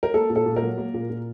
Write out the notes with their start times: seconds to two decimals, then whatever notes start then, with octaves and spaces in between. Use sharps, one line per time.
0.03 A#4
0.14 A#3 A4
0.30 A#2
0.36 A4
0.46 A#2
0.56 A#4
0.62 F#3
0.78 A#3
0.94 A#2
1.10 A#2